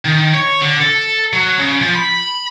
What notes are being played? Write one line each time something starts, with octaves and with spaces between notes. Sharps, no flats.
D#3
C#5
D3
A4
F#3
C#3
F3
B5